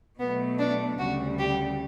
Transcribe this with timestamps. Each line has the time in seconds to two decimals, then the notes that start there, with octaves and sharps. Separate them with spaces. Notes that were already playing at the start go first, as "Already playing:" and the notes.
0.19 B2 F#3 A3 B3
0.59 D4
0.98 D2 C#3 G3 F#4
1.39 G4